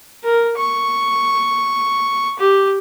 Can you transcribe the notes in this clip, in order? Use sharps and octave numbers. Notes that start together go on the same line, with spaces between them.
A#4
C#6
G4